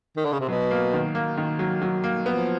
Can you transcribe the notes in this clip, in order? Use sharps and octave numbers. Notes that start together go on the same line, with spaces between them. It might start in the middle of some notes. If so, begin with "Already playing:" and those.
D#3
D3
C#3
C3
B2 F#3
A#3
D#3
A#3
D#3
F#3
F#3
A#3
F3 B3